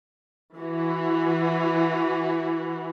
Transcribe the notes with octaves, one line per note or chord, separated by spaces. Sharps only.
E3 F#4